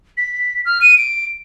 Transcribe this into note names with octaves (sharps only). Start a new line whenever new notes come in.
B6
F6
D#7
D7